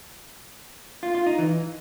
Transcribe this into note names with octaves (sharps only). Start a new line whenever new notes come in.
F4
F4
D#4
E3